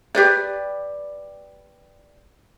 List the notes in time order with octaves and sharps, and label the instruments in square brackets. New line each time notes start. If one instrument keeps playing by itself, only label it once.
[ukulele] G4 B4 D5